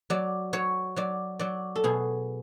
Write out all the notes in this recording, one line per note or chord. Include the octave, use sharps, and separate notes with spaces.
F#3 D5
F#3 C#5
F#3 D5
F#3 D5
A4
B2 G#4